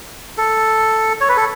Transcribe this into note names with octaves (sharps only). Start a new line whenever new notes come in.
A4
C#5
B4
A4